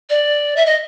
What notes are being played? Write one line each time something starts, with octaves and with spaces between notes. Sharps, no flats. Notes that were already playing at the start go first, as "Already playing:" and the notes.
D5
E5
D#5